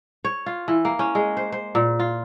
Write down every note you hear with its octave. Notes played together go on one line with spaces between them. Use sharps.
C#5
F4
E3
A#3
C#4
G#3
C5
C5
A#2
F4